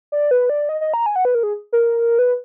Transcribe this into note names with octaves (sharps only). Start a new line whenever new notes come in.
D5
B4
D5
D#5
D#5
A#5
G#5
F#5
B4
A#4
G#4
A#4
B4